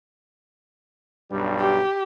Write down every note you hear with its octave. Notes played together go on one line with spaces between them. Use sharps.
B1 G2 G3
G4